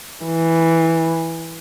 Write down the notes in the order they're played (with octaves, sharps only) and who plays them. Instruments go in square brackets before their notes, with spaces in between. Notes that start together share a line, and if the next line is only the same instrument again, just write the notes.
[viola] E3